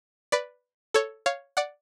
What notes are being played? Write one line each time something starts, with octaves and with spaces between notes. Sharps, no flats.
B4 D5
A4 C#5
C#5 F5
D5 F#5